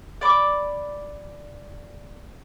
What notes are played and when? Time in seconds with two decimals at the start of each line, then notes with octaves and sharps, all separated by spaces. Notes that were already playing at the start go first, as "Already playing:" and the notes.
0.21 D5 B5 C#6 D6